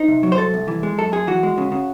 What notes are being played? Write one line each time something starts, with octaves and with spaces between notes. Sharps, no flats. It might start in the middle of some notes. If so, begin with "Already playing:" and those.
Already playing: D#4 C5
C3
F#3
C5
C2 A4
C2
E3
G#3
F#2 A4
F#2 G#4
E3 F#4
G#3
C#3
C#3